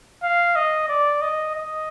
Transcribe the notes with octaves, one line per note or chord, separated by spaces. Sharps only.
F5
D#5
D5
D#5
D#5